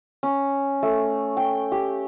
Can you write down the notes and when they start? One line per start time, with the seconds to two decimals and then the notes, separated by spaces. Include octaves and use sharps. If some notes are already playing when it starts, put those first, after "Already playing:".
0.23 C#4
0.83 A3
1.37 G5
1.72 G4